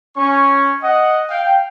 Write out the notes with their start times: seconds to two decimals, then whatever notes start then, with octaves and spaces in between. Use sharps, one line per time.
0.17 C#4 C#6
0.83 D#5 F#5
1.30 F5 G5